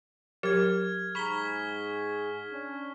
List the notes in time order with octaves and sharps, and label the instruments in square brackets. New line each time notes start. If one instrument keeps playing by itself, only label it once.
[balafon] F#3 G4 A#4 [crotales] F6 G#6
[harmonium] G#2 G#4 [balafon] A#5 B5 [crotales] C#6 B6 G7
[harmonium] C#4 D4